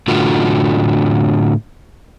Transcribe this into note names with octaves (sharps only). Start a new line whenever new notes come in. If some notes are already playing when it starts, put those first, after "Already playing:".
A2 D3 F4 F#4